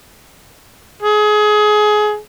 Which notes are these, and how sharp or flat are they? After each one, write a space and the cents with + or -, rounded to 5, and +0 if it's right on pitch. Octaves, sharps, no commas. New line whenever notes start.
G#4 +25